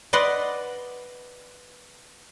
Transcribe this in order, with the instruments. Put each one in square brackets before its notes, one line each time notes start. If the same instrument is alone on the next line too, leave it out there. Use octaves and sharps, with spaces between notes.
[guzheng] B4 D5 D#5 F#5 C6